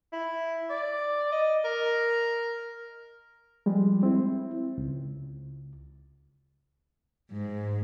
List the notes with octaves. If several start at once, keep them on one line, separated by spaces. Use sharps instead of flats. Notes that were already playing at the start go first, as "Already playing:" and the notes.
E4
D5
D#5
A#4
F3 G3 G#3
C4 E4
C#2
G#2